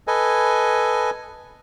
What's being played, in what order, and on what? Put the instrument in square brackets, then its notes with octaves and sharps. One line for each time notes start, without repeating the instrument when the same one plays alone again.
[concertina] A4 B4 D#5 G#5